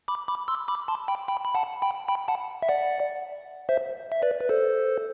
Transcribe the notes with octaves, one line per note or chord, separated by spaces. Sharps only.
B5 D6
B5 D6
C6 E6
B5 D6
A5 C6
G5 B5
G5 B5
B5
F#5 A5
G5 B5
G5 B5
F#5 A5
E5
D5 F#5
C5 E5
E5
B4 D5
B4
A4 C5